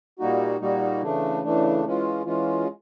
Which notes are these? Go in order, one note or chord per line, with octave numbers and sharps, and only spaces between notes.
A#2 G3 A#3 D#4 F#4
A#2 G3 A#3 D#4 F#4
C#3 E3 A3 D4
C#3 E3 A3 D4
E3 G#3 C#4 F4
E3 G#3 C#4 F4